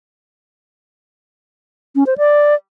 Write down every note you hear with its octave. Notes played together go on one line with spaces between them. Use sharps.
C#4
C5
D5